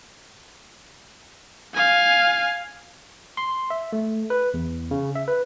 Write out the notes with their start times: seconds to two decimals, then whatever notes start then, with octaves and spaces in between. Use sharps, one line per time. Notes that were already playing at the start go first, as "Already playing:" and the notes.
1.74 F5 G#5
3.37 C6
3.70 E5
3.93 A3
4.30 B4
4.54 E2
4.91 C#3
5.16 E5
5.28 B4